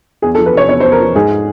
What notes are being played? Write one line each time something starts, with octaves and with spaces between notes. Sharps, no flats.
E2 G#4
A4
F3
B4
C3 C#5
E2 C#5
C5
E2
A#4
F3
G#2 G#4